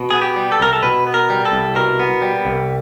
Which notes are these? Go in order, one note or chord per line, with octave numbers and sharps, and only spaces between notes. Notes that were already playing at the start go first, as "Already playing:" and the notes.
Already playing: B2
B3 G#4
G4
G3
A4
C2 A#4
A4
B2 B4
B3
A#4
G3
A4
C2
B2 A#4
B3
G3
C2